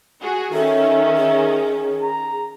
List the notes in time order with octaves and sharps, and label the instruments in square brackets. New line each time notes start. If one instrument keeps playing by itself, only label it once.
[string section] F#4 G#4
[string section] D#3 C#4 [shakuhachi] A4 [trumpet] E5
[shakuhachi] G#4
[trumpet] A#5